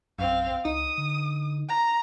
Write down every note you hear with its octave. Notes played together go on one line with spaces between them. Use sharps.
A#1 F#2 C4 F5
C#2 D#4 D#6
D3
A#5